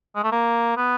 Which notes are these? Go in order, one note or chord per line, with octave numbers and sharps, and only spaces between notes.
G#3
A3
A#3
B3